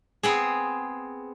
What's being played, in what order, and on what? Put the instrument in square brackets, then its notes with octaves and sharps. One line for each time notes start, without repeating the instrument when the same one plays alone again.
[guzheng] B3 C4 G#4